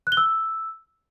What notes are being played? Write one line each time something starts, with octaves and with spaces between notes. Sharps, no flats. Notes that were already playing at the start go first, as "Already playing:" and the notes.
F#6
G7
E6